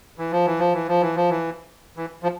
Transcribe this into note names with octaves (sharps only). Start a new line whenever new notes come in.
E3
F3
E3
F3
E3
F3
E3
F3
E3
E3
F3